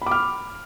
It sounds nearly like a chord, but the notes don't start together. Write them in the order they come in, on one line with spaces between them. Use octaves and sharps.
B5 D6 F6